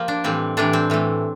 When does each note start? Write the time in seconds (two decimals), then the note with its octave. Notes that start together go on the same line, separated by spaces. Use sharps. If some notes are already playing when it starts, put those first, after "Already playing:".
Already playing: F3 A#3 G4
0.08 D4
0.24 A2 E3 G3 C4
0.57 A2 E3 G3 D4
0.73 C4
0.90 A2 E3 A3